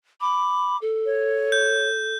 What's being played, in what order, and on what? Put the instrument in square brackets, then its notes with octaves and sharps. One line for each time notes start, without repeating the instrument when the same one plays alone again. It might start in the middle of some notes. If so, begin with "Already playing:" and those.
[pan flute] B5 [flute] D6
[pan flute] A4
[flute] C#5
[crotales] G6